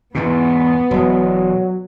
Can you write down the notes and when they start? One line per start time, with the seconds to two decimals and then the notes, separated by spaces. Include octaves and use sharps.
0.15 E2 G#2 B2 B3
0.91 E1 F#3 G#3